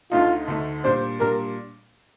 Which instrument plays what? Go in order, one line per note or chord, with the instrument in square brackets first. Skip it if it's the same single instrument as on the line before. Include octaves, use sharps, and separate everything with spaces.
[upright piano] D2 D3 A3 D#4 [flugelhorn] F4
[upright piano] D2 D3 A3 D#4
[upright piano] A#2 G3 D4 [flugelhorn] C5
[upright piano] A#2 G3 D4 [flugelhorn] A#4